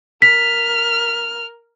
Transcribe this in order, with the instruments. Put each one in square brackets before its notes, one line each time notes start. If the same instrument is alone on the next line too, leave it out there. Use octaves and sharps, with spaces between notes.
[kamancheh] A#4 F6 [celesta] B6